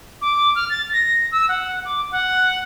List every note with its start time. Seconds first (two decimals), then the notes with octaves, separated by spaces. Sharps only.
0.22 D6
0.55 F6
0.70 A6
0.93 A#6
1.32 E6
1.49 F#5
1.85 D6
2.11 F#5